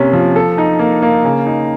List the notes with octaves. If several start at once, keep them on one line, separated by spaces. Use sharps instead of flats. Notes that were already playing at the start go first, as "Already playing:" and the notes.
Already playing: C3 A#3 C#4
F3
A4
D#4
A#3
A#3
C#3
D#4